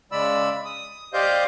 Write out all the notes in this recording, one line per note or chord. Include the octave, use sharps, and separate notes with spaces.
C#3 G#3 D5 B5 E6
D#6
G4 C5 D5 D#5 F5 G6